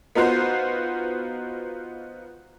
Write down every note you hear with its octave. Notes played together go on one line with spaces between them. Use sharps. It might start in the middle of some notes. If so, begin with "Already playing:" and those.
B3 D#4 F4 F#4 C5